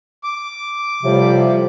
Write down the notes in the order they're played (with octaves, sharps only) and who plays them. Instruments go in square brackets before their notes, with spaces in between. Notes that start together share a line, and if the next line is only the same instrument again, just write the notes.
[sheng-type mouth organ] D6
[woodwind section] A2 G3 [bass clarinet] C3 [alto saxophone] F3